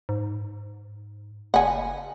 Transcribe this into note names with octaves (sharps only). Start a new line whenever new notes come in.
G#2
F#1 F#5 G#5